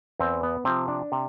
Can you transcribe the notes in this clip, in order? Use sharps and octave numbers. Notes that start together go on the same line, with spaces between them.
E2 C4
B3
C3 F3 C4
D4
C3